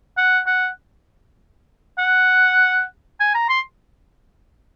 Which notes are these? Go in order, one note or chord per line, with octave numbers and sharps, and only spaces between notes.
F#5
F#5
F#5
G#5
A#5
C6